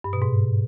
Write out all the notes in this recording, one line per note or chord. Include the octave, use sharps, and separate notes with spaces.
G2
B2
G#2